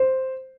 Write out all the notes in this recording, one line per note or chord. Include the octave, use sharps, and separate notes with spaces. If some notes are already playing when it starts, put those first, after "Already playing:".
Already playing: C5